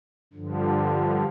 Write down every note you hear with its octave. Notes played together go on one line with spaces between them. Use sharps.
G2 D3 F3